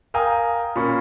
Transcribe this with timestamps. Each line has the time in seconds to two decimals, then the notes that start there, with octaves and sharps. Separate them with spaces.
0.14 A#4 F5 G5 G#5 A#5 D#6
0.76 A#2 A#3 C#4 B5 C#6